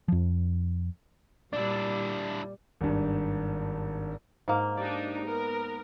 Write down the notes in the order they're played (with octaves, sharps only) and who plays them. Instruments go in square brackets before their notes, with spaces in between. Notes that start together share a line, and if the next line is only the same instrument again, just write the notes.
[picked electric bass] F2 F3
[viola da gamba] A#2 G3 [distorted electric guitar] D4 E4 [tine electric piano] D5
[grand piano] G#1 G2
[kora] G#2 A#3
[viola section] D4 D#4 G4 [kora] D5
[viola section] B3 A#4